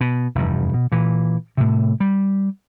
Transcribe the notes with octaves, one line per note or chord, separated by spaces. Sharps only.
B2
F1 E2 G2
B2
A#2 E3
A2 C3
G3